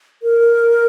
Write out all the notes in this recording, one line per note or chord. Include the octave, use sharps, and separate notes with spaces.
A#4